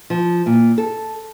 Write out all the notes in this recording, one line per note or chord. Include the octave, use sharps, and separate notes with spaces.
F3
A#2
A4